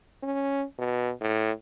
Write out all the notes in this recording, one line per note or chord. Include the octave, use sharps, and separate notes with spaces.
C#4
B2
A2